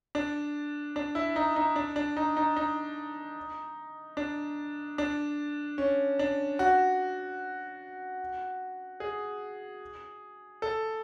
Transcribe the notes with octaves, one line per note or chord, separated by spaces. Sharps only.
D4
D4
E4
D#4
D#4
D4
D4
D#4
D#4
D#4
D4
D4
C#4
D4
F#4
G#4
A4